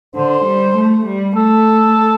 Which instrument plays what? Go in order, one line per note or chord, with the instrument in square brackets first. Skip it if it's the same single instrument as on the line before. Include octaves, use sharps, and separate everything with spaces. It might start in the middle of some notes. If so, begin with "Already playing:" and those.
[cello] D3 [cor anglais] C5
[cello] G3
A3
G3
[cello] A3 [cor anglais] A4